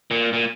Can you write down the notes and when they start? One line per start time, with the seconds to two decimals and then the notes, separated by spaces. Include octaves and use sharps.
0.11 A#2
0.33 A#2